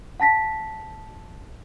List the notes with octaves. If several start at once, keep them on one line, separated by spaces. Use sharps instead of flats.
F#5 A5 A#6 B6